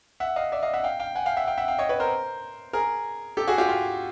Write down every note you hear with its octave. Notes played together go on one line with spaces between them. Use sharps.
E5 F#5
D#5 F5
D5 E5
D#5 F5
E5 F#5
F5 G5
F5 G5
F#5 G#5
F5 G5
E5 F#5
F5 G5
E5 F#5
F5 G5
C#5 D#5
B4 C#5
A#4 C5
G#4 A#4
G4 A4
F#4 G#4
F4 G4
F4